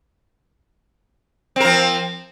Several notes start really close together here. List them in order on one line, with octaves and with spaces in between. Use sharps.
C4 A#4 F3